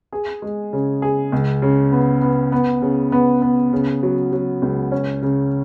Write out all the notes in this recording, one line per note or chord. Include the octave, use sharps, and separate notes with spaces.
G#4
G#3
C#3
G#4
C#2
C#3
B3
B3
B3
C#3
B3
B3
C#3
F#3
F#3
C#2
C#4
C#3